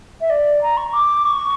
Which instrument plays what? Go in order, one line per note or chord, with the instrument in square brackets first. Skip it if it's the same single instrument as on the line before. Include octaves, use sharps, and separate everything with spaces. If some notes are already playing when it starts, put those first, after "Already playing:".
[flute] E5
D5
A#5
C#6
C#6
D6
C#6